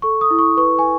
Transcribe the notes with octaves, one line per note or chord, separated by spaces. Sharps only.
A4 C#6
D#6
E4
C#6
B4 C#6
G#5